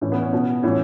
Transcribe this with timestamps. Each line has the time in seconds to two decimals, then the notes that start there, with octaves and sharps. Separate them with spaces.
0.01 A2 E3 C#4
0.12 B3
0.22 C#4
0.33 B2 B3
0.63 A2 E3 C#4